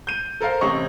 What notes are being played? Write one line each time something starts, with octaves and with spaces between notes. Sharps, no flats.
G6 D#7
A4 A#4 C5 F5
A1 C3 C#5 D#5 C#6